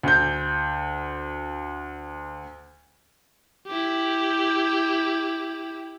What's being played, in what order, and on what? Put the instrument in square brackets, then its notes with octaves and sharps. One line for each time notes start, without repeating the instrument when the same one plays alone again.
[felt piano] D2 G6
[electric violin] E4 G4